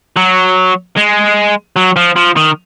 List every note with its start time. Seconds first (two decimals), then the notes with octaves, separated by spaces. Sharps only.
0.16 F#3
0.97 G#3
1.76 F#3
1.96 F3
2.16 F3
2.36 D#3